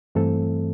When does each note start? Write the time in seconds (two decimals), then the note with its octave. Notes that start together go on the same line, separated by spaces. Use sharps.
0.15 G2 E3 A3 C4 A4